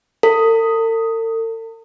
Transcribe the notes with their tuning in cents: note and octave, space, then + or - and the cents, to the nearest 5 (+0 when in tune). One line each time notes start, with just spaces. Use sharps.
A4 +45